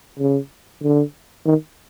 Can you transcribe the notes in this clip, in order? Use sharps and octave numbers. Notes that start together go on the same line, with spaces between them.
C#3
D3
D#3